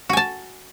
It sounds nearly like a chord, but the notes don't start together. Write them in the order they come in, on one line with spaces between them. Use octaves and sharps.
F#4 G#5 A5